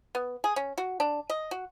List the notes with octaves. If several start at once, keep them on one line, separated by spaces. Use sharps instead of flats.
B3
G#4
C#4
F#4
D4
D#5
F#4